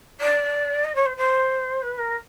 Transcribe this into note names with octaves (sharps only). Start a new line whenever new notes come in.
D5
D#5
C#5
C5
C5
B4
A#4